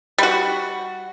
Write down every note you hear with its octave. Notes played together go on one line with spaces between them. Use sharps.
G3 F#4